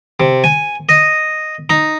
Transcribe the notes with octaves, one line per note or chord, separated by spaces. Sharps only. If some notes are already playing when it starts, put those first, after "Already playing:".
C3
G#5
D#5
D#4